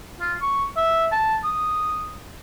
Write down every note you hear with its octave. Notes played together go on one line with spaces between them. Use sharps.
F4
C#6
E5
A5
D#6